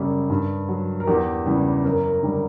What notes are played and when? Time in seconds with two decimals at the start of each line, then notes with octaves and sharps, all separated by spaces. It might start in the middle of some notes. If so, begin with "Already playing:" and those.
Already playing: F#2 C#3 G3
0.30 G2
0.68 F#3
1.00 A#4
1.07 E2 G4
1.46 C#3 E3 G3
1.85 F#2 A#4
2.23 D3 G3